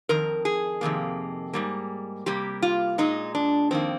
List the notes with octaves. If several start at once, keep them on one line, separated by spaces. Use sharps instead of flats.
F2 D#3 A#4
G#4
F2 C3 D#3 A#3
G#2 G3 A#3
C3 G3 A#3 G4
F4
A#2 G#3 D#4
D4
F2 D#3 A#3 C4